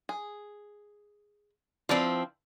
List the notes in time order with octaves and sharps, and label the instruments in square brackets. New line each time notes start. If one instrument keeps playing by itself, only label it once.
[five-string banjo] G#4
[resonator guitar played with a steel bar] F3 C4 [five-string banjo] E4 B4 D5